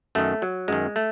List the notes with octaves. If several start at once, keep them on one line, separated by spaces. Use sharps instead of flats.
F#2 D#3 A3
F#3
F#2 D#3 G#3
A3